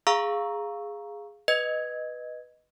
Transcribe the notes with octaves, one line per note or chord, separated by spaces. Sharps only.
G#4 F5 A#5 C#6 E6
B4 D#5 G#6